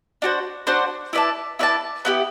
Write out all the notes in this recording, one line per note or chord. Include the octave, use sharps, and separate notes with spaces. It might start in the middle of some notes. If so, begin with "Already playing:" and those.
D4 F#4 C5
D4 F#4 C5
E4 B4 D5 A5
E4 B4 D5 A5
B3 E4 G4